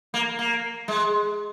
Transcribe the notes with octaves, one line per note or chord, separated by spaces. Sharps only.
A#3
A#3
G#3